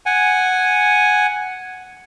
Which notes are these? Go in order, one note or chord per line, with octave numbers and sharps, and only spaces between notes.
F#5 G#5